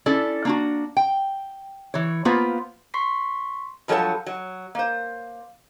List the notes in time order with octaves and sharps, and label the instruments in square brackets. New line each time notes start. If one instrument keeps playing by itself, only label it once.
[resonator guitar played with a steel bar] C#4 E4 A4 D5
A#3 D4 F#4
G5
E3 C#5
A#3 B3 F4 B4 C5 F5
[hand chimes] C6 C#6 B6 C7
[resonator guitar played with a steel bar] G2 F3 F#3 A4 C#5 A5
F#3
A#3 C5